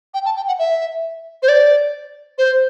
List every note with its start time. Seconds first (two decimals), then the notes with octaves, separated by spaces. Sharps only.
0.14 G5
0.25 A5
0.37 G5
0.48 F#5
0.59 E5
1.43 C5
1.48 D5
2.38 C5